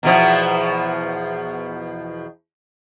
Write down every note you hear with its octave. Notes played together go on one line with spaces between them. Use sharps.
E2 B2 F3